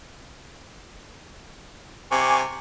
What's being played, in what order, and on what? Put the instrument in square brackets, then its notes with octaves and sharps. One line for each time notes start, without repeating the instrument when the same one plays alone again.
[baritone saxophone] C3 [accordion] G#5 C#6 D6